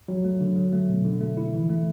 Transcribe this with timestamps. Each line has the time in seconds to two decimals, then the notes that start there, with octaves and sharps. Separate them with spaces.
0.08 F#3
0.25 A3
0.41 D3
0.56 F#3
0.73 A3
0.89 B2
1.04 D3
1.21 A3
1.37 E4
1.54 E3
1.70 A3